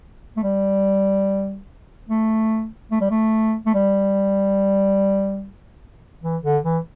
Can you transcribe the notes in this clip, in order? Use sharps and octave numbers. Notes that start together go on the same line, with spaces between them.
A3
G3
A3
A3
G3
A3
A3
G3
E3
D3
E3